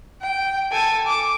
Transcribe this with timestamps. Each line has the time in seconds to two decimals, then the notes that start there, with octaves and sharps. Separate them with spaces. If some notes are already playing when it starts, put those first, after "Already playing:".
0.22 G5
0.72 A4 G#5
1.07 D6